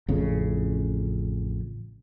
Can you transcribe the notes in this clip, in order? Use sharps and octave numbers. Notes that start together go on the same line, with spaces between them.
A1 F2 C#3